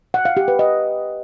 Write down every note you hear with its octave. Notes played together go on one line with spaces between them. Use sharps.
F#5
F5
G4
B4
D#5